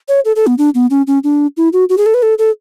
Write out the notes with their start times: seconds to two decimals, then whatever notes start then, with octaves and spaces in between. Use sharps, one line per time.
0.08 C#5
0.25 A4
0.36 A4
0.47 B3
0.58 D4
0.75 B3
0.90 C#4
1.07 C#4
1.24 D4
1.57 E4
1.73 F#4
1.89 F#4
1.97 G#4
2.06 A4
2.14 B4
2.22 A4
2.38 A4